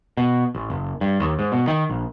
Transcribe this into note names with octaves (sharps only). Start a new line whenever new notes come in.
B2
A1
F#1
G2
D#2
G#2
B2
D#3
A#1